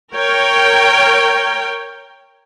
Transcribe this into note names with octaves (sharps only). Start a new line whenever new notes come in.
A#4 C#5 G5